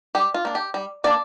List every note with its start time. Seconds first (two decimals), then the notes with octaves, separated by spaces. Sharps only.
0.15 G3 G4
0.34 F4
0.45 A#3 D4
0.55 G4
0.74 G3
1.04 A#3 D4 D5